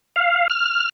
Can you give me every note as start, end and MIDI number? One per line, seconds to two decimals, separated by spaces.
0.16 0.48 77
0.50 0.89 89